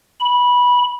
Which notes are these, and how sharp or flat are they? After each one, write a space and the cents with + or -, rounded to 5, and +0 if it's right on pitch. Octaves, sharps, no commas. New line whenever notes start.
B5 -15